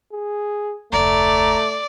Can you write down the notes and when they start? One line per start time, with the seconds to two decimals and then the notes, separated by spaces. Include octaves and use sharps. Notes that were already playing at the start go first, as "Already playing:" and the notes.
0.13 G#4
0.93 F1 D2 A3 D5 A#5